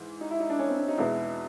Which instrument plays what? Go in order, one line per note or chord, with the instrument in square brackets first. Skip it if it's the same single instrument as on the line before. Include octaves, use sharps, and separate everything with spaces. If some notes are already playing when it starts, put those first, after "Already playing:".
Already playing: [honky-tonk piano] G#2 E3
[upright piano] D#4
E4
D#4
D4
C#4
C4
C#4
D#4
[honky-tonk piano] E2 B2 G#3 B3 [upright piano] E4